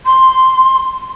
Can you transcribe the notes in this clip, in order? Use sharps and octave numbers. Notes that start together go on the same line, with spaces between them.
C6